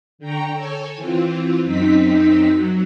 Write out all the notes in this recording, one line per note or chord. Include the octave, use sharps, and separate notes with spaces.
D3 G5 A#5 C#6
A4 C#5 G#5
E3 C4 F4
F#2 C4 D#4 B6
F#3